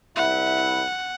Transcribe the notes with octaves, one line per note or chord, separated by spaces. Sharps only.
C2 E4 F#5